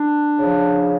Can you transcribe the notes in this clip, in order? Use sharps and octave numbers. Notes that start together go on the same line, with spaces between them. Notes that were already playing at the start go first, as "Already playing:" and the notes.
Already playing: D4
C#3 F3